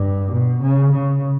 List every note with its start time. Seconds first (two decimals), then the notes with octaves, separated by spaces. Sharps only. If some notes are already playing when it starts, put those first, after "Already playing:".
Already playing: G2
0.32 B2
0.62 C#3
0.92 C#3